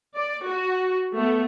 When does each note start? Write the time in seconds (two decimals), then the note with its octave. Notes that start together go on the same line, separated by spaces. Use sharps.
0.15 D5
0.46 F#4
1.16 A3 B3